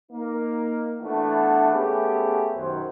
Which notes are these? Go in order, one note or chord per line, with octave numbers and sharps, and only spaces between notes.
A#3 D#4 A#4
E3 A3 B3 D4 E4 F#4
A3 B3 C#4 G4 G#4
B1 F#2 D#3 F#3 C5